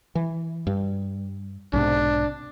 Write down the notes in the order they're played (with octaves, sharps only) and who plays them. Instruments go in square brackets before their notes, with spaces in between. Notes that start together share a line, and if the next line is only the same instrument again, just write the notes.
[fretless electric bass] E3
G2
[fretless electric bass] B1 G#2 C3 [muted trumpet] D4